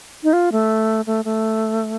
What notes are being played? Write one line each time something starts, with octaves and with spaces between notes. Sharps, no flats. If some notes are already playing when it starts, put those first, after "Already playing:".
D#4
F4
A3
A3
A3